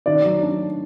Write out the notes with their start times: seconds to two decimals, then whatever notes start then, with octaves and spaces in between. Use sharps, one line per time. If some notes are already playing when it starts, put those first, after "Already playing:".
0.06 D#3 D5
0.24 F#3
0.43 D4